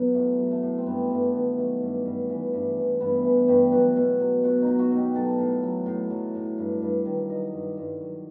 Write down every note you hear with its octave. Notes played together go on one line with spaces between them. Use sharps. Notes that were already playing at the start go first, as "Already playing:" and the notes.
Already playing: F#3 B3
A2 A3
F#3
A3
A2
C4
G2 B3
G2 A3
B3
D#3
F#3 A3
G2
G2
E3
G2
E3
G2 B3
E3
G2 G4
F#3 F#4
B2
F#3
B2 F#4
D#4
F#3
F#4
B2
G4
F#3 A4
A2
F#3
A2
F#3
A2
G2
G2
D#3
F#3 D#5
G2
G2
F#3